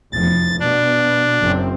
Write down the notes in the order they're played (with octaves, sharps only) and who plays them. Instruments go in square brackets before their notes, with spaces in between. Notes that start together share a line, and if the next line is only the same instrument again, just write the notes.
[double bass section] F1 E2 F3 [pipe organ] A6
[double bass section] B2 B3 [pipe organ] D4
[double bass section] F#1 F#2 C4